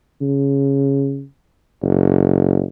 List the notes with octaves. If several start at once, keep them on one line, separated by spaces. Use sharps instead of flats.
C#3
F#1